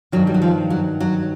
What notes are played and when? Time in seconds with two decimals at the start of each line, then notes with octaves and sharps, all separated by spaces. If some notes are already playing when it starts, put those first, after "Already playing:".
0.12 G2 D#3 F#3
0.27 G3
0.34 F#3
0.42 F3
0.70 F#3
1.00 F#3